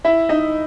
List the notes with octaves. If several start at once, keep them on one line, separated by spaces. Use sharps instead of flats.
E4 E5
D#4 D#5